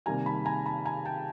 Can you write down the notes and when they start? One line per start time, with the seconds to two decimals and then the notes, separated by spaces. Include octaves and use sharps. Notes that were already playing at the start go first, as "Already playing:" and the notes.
0.06 C3 D#3 G3 A#3 G#5 A#5
0.26 A5 B5
0.45 G#5 A#5
0.66 A5 B5
0.85 G#5 A#5
1.05 G5 A5